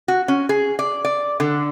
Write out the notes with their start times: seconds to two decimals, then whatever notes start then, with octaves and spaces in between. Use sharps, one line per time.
0.08 F#4
0.28 C#4
0.49 G#4
0.79 D5
1.05 D5
1.40 D3